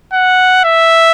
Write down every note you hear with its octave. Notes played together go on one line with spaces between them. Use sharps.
F#5
E5